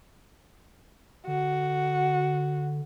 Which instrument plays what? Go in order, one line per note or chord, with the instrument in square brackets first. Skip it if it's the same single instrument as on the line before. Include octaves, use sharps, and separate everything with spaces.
[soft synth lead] D3 [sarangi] F#4